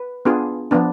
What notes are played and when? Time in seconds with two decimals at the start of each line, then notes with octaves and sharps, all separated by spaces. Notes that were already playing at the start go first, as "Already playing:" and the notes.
Already playing: B4
0.25 B3 D4 F4 G#4
0.71 F3 B3 D4